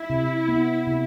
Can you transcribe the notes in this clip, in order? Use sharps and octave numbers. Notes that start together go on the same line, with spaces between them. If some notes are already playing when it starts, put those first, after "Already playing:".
Already playing: E4
C3
B3
C3